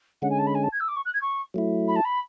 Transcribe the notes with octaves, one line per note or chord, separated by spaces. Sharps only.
D3 G#3 C#4 F#5
G#5
A5
B5
G#5
A5
G#6
E6
D6
C#6
F#6
G#6
C#6
F#3 A3 E4
B5
A5
B5